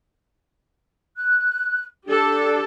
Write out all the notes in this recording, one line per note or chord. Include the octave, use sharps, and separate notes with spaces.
F#6
D4 G4 A4